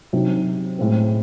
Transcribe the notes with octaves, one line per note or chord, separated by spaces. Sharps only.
C3 D#3 F#3 C4
A2 G#3 C4